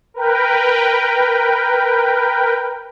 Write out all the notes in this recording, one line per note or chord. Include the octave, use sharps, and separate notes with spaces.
A#4 B4 G5